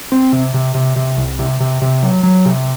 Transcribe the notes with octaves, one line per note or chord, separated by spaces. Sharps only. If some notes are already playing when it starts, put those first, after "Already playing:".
C4
C3
C3
C3
C3
C2
C3
C3
C3
F#3
F#3
C3